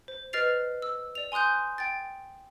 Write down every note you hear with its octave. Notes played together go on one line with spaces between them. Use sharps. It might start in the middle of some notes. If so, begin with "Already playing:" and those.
C5
B4 D#5 F6 A6 C7 F7
E6
D5 F7
G#5 C6 D#6 F#6 G6
G5 A6